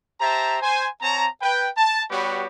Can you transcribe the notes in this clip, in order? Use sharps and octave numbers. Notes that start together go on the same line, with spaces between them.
G4 C5 E5 A5 A#5
C5 G#5
C4 C#5 A5 A#5
B4 G5
A5
G3 B3 F#4 G4 B4 C#5